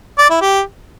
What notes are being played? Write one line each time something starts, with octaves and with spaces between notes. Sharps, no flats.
D5
E4
G4